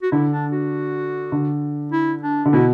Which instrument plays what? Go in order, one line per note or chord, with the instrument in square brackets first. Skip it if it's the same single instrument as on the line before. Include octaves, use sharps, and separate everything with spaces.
[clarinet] F#4
[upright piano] D3 [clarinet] E4
[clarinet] D4
F#4
[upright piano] D3
[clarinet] E4
D4
[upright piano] D3
[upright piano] B2 [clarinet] E4